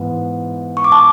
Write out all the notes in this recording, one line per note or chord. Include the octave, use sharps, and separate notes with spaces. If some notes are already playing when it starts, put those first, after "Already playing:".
Already playing: G#2 E3 B3
C#6
D6
A5 C#6